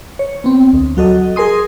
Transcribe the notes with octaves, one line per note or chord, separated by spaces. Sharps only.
C#5
B3 C4
D2
F#3 F#4 A4 D#5
G#4 A#4 G#5 C6 D#6